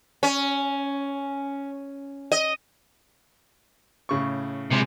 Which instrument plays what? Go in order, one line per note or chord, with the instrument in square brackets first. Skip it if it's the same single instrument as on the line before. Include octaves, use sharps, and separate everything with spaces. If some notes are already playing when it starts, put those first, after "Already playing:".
[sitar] C#4
D#5
[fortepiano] A2 C#3 C#6
[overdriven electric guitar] C3 G#3